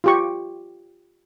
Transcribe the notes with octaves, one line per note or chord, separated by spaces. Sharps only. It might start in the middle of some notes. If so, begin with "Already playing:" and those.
F4 G4 C#6